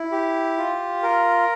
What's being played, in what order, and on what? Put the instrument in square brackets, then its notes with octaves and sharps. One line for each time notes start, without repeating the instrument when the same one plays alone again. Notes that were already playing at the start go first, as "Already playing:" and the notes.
Already playing: [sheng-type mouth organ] E4
G4
F4
A#4